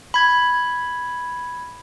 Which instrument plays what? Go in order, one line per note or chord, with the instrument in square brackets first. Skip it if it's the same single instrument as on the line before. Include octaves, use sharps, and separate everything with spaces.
[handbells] B5 G#6